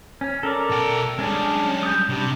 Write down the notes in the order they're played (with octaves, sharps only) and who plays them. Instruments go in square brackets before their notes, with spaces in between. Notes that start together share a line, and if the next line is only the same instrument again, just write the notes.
[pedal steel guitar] C#4
A4 A#4 D5
[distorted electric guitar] B2 G5
[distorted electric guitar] G3 G#3 [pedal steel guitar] C#4 D4 G#4
[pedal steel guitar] D#6 G6
[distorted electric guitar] C3 [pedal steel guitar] G3 D4